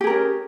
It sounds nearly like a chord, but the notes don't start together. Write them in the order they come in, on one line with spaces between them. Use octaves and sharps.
G4 G#4 A#4 C#4